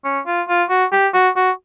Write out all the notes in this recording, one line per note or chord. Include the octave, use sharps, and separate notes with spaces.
C#4
F4
F4
F#4
G4
F#4
F#4